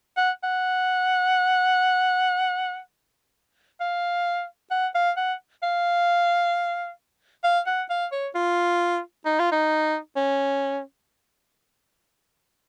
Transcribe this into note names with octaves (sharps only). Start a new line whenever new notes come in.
F#5
F#5
F5
F#5
F5
F#5
F5
F5
F#5
F5
C#5
F4
D#4
F4
D#4
C#4